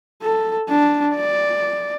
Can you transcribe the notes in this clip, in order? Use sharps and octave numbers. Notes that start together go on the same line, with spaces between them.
A4
D4
D5